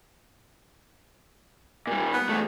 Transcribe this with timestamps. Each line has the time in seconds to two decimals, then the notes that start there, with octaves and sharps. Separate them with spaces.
1.87 A#2 G3
2.14 B3
2.29 E2 A3